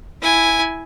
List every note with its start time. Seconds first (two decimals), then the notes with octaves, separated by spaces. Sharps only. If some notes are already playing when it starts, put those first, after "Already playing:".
0.22 E4 G#5